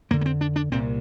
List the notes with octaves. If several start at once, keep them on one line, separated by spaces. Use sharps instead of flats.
F2 D3 A#3
A#3
C4
D4
D4
C2 A#2 C4